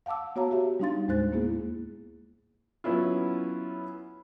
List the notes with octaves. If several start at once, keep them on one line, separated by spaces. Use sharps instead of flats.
F5 F#5 A5 D6 E6
B3 F#4 C#5 F5 A5 A#5
F#4 G4 E5
G3 D4 D#4 F5 C6 A6
D#2 A2 G#3 C5 F#6 A6
A#3 B3 E4 G#4
F#3 B3 C#4 E4 F4